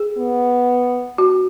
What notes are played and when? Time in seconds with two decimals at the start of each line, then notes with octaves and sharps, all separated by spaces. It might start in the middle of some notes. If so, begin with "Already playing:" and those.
Already playing: G#4
0.18 B3
1.18 F#4